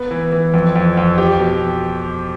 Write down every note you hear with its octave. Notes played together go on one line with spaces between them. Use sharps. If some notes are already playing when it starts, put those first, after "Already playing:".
Already playing: B3
E3
E3
F2
F2
F2
G4
B2